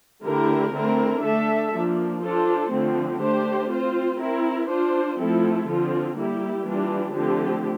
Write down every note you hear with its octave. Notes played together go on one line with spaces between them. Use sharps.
D3 A3 E4 G4 A#4
D3 A3 C4 E4 A#4
A3 D4 A4 E5
F3 A#3 D4
D4 F4 A4 C5
D3 F3 A3 C4
A3 D4 G4 C5
C4 F4 C5
C4 E4 A#4
D4 F4 C5
F3 A3 C4 E4 A4
D3 F3 C4 F4
G3 A#3 E4 G4
E3 G3 D4 F4
D3 F3 A3 C4 G4